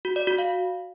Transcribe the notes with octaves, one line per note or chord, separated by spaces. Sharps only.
F#4
D5
F#4
F5